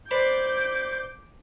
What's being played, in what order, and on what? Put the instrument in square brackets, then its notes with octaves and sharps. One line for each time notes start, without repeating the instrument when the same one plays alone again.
[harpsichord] B4 C5 D5 [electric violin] D6 G6